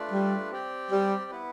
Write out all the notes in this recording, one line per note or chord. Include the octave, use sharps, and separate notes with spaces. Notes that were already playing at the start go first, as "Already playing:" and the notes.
Already playing: A3 D4 F4 B4 D5
G3
C4 G4 D5 G5
G3
B3 E4 B4